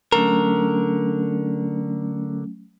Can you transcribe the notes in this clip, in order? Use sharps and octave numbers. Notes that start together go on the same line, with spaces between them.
D3 F#3 A3 C#4 A#4